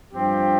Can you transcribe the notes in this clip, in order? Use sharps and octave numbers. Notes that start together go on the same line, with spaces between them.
G2 F3 C4 G4